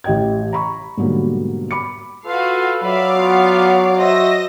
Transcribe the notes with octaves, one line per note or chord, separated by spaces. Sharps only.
A1 G4 D#5 G5 G#6
A#5 B5 C#6
G#2 B2 D3 F#3 G3 A#3
B5 D6 C#7
F4 F#4 A4 B4 F5
F#3 D5 E5 F5 B5 D6
B3 F4 F#4
F#4 C5 D#5 E5 A#6